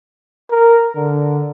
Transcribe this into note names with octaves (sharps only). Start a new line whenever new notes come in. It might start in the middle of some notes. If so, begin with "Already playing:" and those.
A#4
D3